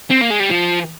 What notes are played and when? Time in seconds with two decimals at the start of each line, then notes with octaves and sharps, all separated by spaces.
0.10 C4
0.21 A#3
0.30 G#3
0.40 G3
0.50 F3